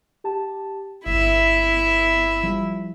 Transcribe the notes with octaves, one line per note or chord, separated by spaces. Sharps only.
G4 A5
G1 E4 E5
F3 G3